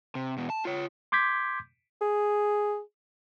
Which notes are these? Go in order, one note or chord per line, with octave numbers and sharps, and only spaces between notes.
C3
E2 B2
A5
F4 C#5
C6 D6 G6 G#6 B6
G#4